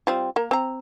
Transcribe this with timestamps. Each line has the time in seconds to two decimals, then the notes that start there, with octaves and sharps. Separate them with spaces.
0.07 G3 C4 F4
0.36 A#3 A#4
0.51 C4 A#5